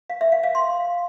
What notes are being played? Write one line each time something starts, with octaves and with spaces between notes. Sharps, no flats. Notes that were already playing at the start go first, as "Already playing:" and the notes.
F5
E5
F5
F5
C6